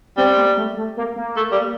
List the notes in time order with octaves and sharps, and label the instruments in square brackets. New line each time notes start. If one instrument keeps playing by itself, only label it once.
[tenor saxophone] G3 [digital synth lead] C4
[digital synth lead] A#3
A3
A3
A#3
A#3
[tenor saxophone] A3
G3